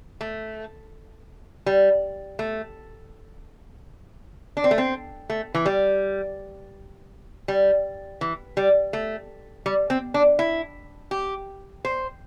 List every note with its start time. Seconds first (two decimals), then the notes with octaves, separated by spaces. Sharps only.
0.21 A3
1.66 G3
2.39 A3
4.57 D4
4.64 C4
4.71 A3
4.78 C4
5.30 A3
5.54 E3
5.66 G3
7.48 G3
8.21 E3
8.57 G3
8.93 A3
9.66 G3
9.90 C4
10.14 D4
10.39 E4
11.11 G4
11.85 C5